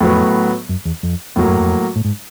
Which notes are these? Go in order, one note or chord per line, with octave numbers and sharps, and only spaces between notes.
F2 A2 F#3 B3
F#2
E2
F2
F2 A2 F#3 A#3
F#2
F2
A2
G#2